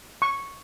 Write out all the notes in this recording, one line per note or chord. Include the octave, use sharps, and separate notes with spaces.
C#6